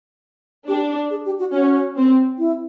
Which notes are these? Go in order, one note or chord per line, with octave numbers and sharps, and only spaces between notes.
D4 G4
G#4
G4
F#4
C#4 F#4
C4
E4